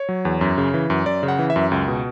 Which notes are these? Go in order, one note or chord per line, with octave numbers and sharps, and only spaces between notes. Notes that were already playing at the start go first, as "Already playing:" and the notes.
Already playing: C#5
F#3
E2
F#2
C#3
E3
F#2
F#2 D5
C#3
F#5
E3
E5
F#2
C#2
B2